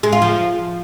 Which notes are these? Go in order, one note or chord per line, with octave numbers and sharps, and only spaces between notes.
G#3
F4
F3